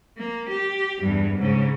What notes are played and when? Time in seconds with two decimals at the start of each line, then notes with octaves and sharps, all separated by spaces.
0.17 A#3
0.49 G4
1.01 E2 G2
1.38 G#2 C#3